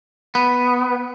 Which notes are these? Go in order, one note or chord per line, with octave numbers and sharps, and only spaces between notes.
B3